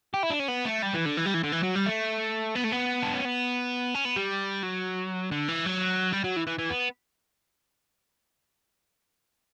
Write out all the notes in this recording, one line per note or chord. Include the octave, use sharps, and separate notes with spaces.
G4
E4
D4
C#4
B3
A3
G3
E3
D3
E3
G3
E3
D3
E3
F#3
G3
A3
B3
A3
B3
D4
C#4
B3
C#4
B3
G3
F#3
D3
E3
F#3
G3
F#3
E3
E3
E3
B3